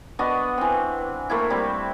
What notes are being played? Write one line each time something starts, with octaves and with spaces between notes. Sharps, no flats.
B3 D4 F#4 D#5
E3 C4
A3 A#3 E4
G3 C4 B5